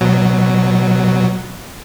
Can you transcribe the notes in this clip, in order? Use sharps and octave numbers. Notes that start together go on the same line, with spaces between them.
B2 F#3